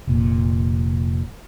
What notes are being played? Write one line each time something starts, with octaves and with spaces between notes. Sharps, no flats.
F1 A#2